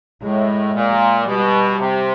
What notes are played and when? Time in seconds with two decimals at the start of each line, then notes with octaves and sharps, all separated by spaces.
0.22 A2 G#3
0.74 A#2
1.26 B2 G3
1.78 C3